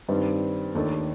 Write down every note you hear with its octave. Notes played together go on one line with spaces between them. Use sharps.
G2 D#3 G3 C4
D#2 D#3 A3 D4 A4